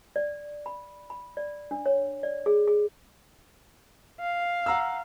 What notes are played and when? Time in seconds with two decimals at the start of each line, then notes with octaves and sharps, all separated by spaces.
0.16 D5
0.66 B5
1.10 B5
1.37 D5
1.71 D4
1.86 C#5
2.23 D5
2.46 G#4
2.67 G#4
4.21 F5
4.66 F#5 A#5 E6